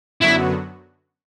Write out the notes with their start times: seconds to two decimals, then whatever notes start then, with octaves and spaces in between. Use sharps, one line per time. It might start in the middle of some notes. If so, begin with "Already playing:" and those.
0.22 F#2 D3 F#3 B3 E4 F#4